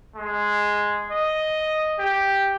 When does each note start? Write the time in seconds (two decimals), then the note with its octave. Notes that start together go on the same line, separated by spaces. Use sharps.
0.16 G#3
1.11 D#5
1.99 G4